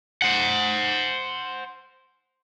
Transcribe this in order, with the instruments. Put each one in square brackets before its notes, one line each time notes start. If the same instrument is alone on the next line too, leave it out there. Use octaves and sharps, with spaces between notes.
[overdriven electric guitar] C5 F#5